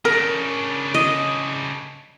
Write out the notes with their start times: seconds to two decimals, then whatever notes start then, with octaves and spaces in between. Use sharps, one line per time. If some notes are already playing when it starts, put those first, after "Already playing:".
0.05 C#3 D4 A#4
0.94 D#5